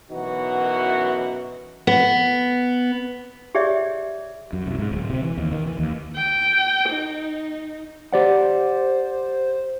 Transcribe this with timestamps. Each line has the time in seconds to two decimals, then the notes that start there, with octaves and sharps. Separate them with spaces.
0.10 F#2 B2 E3 D#4 F#4 B4
1.87 B3
3.55 G4 G#4 C#5 D5 E5
4.53 F#2
4.66 C2
4.79 G#2
4.91 D1
5.10 C3
5.24 E3
5.37 D#2
5.52 D#3
5.67 E3
5.79 D#2
6.16 G5
6.89 D#4
8.12 G4 C5 D5 F#5